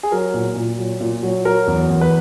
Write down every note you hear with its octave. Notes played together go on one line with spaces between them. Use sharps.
G#4
F#3 A#4
A#2
A#2
F#3
A#2
F#3
F#3 A#4
E2
E2
B4